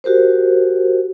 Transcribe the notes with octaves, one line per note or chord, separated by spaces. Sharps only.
F#4 G4 A#4 C5